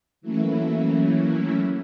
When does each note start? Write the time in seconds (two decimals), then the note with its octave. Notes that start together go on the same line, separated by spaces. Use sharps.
0.21 E3 F#3 A3 A#3 C#4 E4